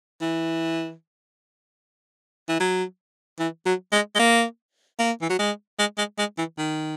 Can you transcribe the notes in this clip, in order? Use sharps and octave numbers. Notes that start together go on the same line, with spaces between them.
E3
E3
F#3
E3
F#3
G#3
G#3
A#3
A#3
E3
F#3
G#3
G#3
G#3
G#3
E3
D#3